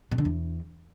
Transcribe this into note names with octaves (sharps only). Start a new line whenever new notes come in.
B2
D3
E2